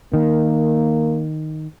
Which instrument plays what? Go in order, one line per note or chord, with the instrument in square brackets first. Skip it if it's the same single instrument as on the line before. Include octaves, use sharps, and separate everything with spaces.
[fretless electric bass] D#3 [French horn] A#3